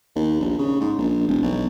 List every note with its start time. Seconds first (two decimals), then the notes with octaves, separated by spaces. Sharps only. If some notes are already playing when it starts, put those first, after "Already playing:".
0.15 D#2
0.40 A#1
0.58 C#3
0.81 G#2
0.98 A#1
1.28 E1
1.42 B1